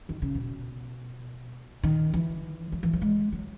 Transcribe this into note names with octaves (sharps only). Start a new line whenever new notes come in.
D#3
C#3
B2
D#3
E3
F#3
E3
F#3
G#3
F#3